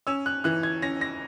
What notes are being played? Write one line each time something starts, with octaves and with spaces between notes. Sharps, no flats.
C#4 E6
F#6
E3 F#6
G#6
C#4 A#6
A#6